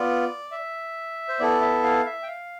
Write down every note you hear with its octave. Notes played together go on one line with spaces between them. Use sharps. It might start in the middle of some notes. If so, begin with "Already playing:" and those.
Already playing: B3 F4 D5
E5
C5
B3 E4 A4 D5
E5
F5
E5
G5
F5